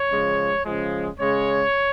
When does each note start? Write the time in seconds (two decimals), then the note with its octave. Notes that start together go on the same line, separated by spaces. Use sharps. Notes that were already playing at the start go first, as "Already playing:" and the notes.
Already playing: C#5
0.09 C#3 F3 G#3
0.65 C#3 F3 G#3
1.19 C#3 G#3 C#5